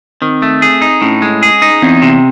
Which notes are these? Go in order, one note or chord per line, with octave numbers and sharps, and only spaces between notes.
D#3 C4
A3
G#4
D#4
A2 C#4
G#3
G#4
D#4
E2 C4
C3